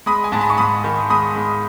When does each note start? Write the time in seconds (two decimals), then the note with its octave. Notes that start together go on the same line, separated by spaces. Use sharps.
0.06 G#3 B5 D#6
0.24 G#5
0.32 G#2 A5
0.41 B5
0.50 C#6
0.58 G#2 B5 D#6
0.84 D#3
1.10 G#3 B5 D#6
1.36 G#2